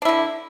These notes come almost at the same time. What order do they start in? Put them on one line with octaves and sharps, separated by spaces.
D4 E4 D3